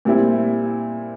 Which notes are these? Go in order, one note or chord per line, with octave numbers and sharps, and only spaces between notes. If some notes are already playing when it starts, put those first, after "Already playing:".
A#2 G3 C4 E4